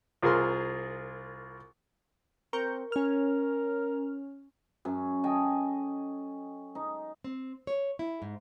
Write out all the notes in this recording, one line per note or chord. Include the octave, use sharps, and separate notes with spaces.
C2 F4 G#4 A#4 C6
C4 A#4 C#6 G6
C#4 A#4 F6
F#2 C#4
A4 D#5 G5 G#5
D#4
C4
C#5
E4
G#2